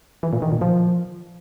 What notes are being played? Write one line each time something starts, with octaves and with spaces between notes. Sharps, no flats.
E3
A#2
D#3
A#2
F3